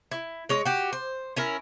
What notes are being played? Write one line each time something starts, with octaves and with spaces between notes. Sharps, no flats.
E4
G#3 C#5 D#5
F#4 G4
C5
C#4 E4 A#4